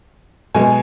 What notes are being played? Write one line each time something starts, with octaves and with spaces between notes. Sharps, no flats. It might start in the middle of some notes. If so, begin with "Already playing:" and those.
B2 G#3 B3 G#5